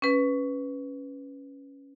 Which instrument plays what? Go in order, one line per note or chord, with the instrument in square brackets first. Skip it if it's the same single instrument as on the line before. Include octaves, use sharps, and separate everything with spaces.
[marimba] C#4 B4